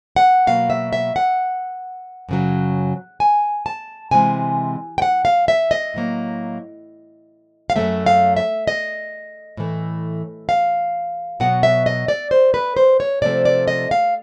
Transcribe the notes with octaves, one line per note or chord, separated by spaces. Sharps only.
F#5
B2 F#3 A#3 F5
E5
E5
F#5
F#2 C#3 F#3
G#5
A5
C3 E3 G#3 G#5
G5
F#5
F5
E5
D#5
A2 F#3 A#3
F5
F#2 D3 F#3 A3 E5
F5
E5
D#5
A2 E3 A3
F5
B2 F#3 B3 F#5
E5
D#5
D5
C5
B4
C5
C#5
C3 F3 A3 D5
D5
D#5
F5